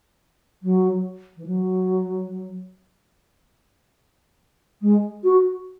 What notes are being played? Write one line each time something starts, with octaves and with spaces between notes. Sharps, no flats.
F#3
E3
F#3
G#3
F#4